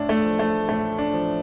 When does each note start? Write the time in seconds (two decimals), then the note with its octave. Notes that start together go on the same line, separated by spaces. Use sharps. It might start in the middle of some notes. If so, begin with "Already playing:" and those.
Already playing: A2 D4
0.09 A3
0.24 F3
0.39 A3
0.69 A2 A3
0.98 D4
1.14 F3